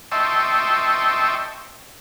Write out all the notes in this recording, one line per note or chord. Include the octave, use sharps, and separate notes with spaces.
D#5 E5 G5 A5 C6 C#6